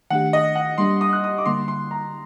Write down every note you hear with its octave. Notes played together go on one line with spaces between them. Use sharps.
D#3 A3 D4 G4 F#5
D#5
F#5
G3 A#3 D4 G4 C6
D#6
F#6
D#6
D6
D3 G3 A#3 C6
C6
A#5